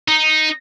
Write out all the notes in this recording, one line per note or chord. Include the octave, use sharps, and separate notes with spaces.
D#4